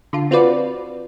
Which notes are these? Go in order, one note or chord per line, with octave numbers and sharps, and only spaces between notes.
D3 F4
C4 F4 F#4 B4 D5